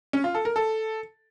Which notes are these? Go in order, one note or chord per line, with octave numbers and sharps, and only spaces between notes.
C#4
F4
A4
A#4
A4